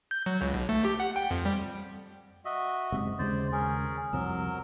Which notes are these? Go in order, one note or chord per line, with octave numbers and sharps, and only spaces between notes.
G6
F#3
C#2
B1
A3
G4
F#5
G5
F2
G3
F#4 D#5 E5
F#1 G#2 C3
D#2 C#3 G#3 C5 D5
C#4 G#4 A#4
C2 F2 C3 F#3 A#4 E6